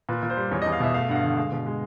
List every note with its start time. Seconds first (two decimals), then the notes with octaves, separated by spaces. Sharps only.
0.09 A#2 B4
0.23 A#2
0.30 C5
0.37 G3
0.51 E2 C#5
0.62 E2 D#5
0.72 F5
0.80 B2 E5
0.94 A3 F5
1.09 G2 F#5
1.16 F5
1.23 D3
1.37 G#3 F5
1.52 B2
1.66 G#3